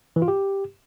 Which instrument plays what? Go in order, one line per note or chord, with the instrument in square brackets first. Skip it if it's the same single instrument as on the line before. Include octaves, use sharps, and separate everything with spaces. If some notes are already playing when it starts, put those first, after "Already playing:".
[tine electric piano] E3
F4
G4